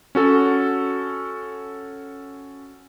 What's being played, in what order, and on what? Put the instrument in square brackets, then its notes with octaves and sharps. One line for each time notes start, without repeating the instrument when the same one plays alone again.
[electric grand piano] C#4 F#4 A4